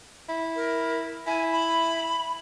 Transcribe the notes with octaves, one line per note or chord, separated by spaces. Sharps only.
E4
A#4
E4 G#5
B5